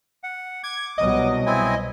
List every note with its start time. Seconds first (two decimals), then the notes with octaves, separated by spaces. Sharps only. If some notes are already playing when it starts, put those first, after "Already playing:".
0.23 F#5
0.63 D6 G#6
0.98 C2 B2 F#3 D#5
1.46 C4 E4 G#5